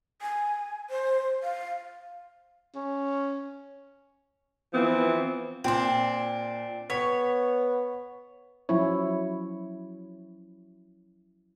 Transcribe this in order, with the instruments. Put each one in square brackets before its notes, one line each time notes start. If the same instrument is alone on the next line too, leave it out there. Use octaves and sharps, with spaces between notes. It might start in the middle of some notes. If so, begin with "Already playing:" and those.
[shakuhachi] G#5
C5
F5
[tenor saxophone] C#4
[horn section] E3 F3 B3 C4
[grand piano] A#2 C6 [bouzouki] C4 D4
[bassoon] B3 [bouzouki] C#5 [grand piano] C#6 B6
[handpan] F3 F#3 C#4 E4 C#5